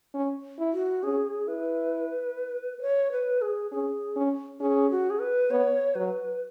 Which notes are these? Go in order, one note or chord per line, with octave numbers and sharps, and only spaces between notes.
C#4
E4
F#4
C#4 G#4
E4 B4
B4
C#5
B4
G#4
C#4 G#4
C#4
C#4 G#4
F#4
G#4
B4
B3 C#5
F#3 B4